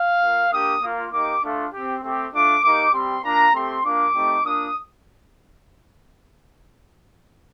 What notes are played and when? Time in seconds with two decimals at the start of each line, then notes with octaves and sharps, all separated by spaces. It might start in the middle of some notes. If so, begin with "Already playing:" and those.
Already playing: F5
0.20 A#3 F4
0.50 A#3 D4 G4 D#6
0.82 A#3 F4
1.11 A#3 D#4 G4 D6
1.42 A3 D4 F4
1.71 G4
1.77 C4
2.03 A3 C4 G4
2.33 A3 D4 F4 D6
2.62 A#3 D#4 G4 D6
2.92 G3 C4 G4 C6
3.23 A#3 D4 F4 A#5
3.53 A3 C4 G4 C6
3.84 A#3 D4 F4 D6
4.13 A3 C4 D#4 G4
4.44 A#3 D4 F4 D#6